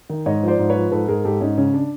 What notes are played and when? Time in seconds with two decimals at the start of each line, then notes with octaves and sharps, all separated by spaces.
0.10 D#3
0.26 G#2 C#5 D#5
0.43 F3 C5 D5
0.59 G#2
0.70 B4 C#5
0.75 F3
0.92 G#2 A4 B4
1.08 G#2 G#4 A#4
1.24 G#2 G4 A4
1.41 G#2 C#4 D#4
1.58 C#3 C#4
1.74 D4